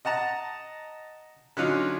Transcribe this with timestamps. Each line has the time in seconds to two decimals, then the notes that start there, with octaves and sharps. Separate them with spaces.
0.05 D#5 F#5 A5 A#5
1.57 D3 F#3 C#4 D#4 F4